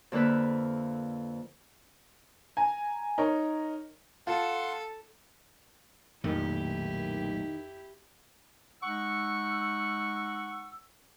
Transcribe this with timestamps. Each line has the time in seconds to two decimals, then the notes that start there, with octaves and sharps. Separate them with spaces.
0.12 F2 D3 A#3 B4 E5
2.57 G#5 A#5
3.18 D#4 A#4 C#5
4.27 F4 A4 F#5 A5 C6
6.24 B1 F2 A#2 D#3 A3 E4 G4
8.82 G#3 D#4 F#5 C#6 E6